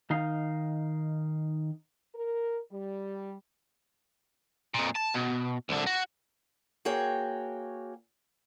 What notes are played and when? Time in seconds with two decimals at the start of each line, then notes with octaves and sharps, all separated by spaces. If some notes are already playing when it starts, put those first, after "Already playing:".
0.10 D#3 D#4 F5
2.15 A#4
2.71 G3
4.74 F2 A#2
4.96 A5
5.15 B2
5.69 C2 D3
5.87 F#4
6.85 A#3 F#4 G#4 C#5 G5